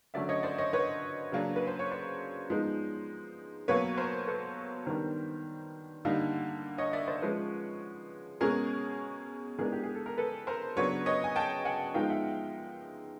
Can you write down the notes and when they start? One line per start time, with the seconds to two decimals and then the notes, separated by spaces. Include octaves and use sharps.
0.14 D3 F#3 A3 C#4 D5 E5
0.29 C#5 D#5
0.43 C5 D5
0.58 C#5 D#5
0.73 B4 C#5
1.32 C#3 F#3 A#3 D4
1.56 B4
1.67 C5
1.79 C#5
1.91 C5 D5
2.50 F3 G#3 B3 D#4
3.68 B2 F#3 A#3 B4 C#5
3.98 A#4 C5
4.27 A4 B4
4.86 D#3 G3 B3 D4 A#4 C5
6.05 D3 G3 A#3 D#4
6.78 C#5 D#5
6.93 D5 E5
7.07 C5 D5
7.22 F3 G#3 C#4 B4 C#5
8.41 B2 G#3 C#4 G#4 A#4
9.58 E3 G#3 B3 D4 G#4 A#4
9.72 G4
9.83 G#4
9.95 A4
10.06 A#4
10.18 A4 B4
10.47 A#4 C5
10.76 C#3 F#3 B3 D4 B4 C#5
11.06 C#5 D#5
11.24 G#5
11.36 G5 A5
11.65 F#5 G#5
11.94 F3 G#3 B3 D#4 F5 G5
12.09 E5 F#5